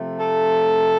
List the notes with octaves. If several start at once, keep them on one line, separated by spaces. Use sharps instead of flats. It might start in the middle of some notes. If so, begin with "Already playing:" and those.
Already playing: C3 F3 A3
A4